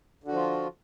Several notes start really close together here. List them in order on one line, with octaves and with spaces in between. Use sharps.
D3 F#4 F3 F4